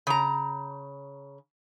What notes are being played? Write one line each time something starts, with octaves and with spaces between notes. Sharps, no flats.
C#3 A#5